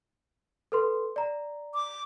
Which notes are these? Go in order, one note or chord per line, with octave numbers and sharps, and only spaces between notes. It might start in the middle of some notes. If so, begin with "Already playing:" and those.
A4 B4 C6
D5 A#5
D6